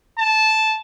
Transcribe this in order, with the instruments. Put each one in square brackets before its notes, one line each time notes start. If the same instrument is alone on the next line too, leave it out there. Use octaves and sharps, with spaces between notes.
[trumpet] A5